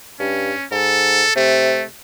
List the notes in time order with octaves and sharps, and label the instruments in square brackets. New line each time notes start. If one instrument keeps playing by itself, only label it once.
[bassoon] G2 [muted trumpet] C#4
[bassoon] G#2 [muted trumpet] A4
[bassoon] C3 [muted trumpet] A3